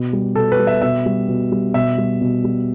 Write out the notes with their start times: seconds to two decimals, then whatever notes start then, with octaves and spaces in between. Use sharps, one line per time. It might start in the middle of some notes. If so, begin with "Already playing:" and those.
Already playing: B2
0.13 G3
0.36 B2 A4
0.52 B4
0.59 G3
0.67 E5
0.82 B2 E5
1.06 G3
1.29 B2
1.52 G3
1.74 B2 E5
1.98 G3
2.21 B2
2.44 G3